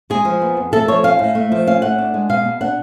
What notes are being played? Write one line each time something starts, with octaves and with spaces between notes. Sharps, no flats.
G#3 G#4
F3
B3
F2
A3 A4
F3 C#5
C#4 F5
A2
A3
F3
C#4 F5
A2 F#5
D4
G#3
B2 F5
B2
D4 F#5